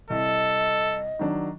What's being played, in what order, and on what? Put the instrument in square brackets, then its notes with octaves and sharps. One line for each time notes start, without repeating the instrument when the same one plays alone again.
[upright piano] C2 [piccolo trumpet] A4 [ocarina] D#5
[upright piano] D#3 F#3 D4